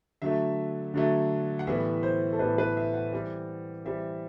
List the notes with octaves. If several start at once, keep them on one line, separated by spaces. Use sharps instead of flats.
D3 F#3 A3 E5
D3 F#3 A3
F#5
A2 E3 G3 B3 E5
C5
A4
A2 E3 G3 B3 B4
B4
E5
F#5
E3 G3 C4
E3 G3 C4 E5